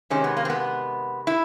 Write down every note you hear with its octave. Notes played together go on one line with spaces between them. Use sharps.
C3 D#3 G#3 C#4
B3
A#3
C4
B3
E4